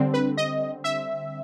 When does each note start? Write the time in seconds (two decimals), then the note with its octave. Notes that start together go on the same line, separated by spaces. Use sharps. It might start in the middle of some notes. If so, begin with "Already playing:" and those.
Already playing: D3 G3 C4
0.14 B4
0.37 D#5
0.84 E5